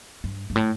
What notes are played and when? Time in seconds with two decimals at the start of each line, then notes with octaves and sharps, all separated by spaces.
0.24 G2
0.50 G2
0.56 A2